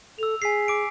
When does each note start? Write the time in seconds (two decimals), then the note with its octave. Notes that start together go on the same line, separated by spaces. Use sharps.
0.19 A4 E6 F7
0.42 G#4 G#5 B6 C7
0.68 D6 D7